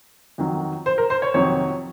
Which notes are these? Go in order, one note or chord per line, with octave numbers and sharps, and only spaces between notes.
F2 D#3 F#3
C5
A#4
C5
C#5
F2 C3 D#3 F#3 C#5